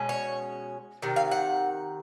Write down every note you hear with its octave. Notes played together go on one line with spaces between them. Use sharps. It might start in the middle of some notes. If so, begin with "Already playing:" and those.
Already playing: B2 G#3 C#4
C#5
C3 D#3
F5
F#5